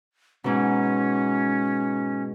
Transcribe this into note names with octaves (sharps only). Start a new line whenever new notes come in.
G#2 B2 C#4